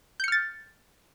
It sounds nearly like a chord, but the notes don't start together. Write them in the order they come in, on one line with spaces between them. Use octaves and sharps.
G6 C#7 F6 A6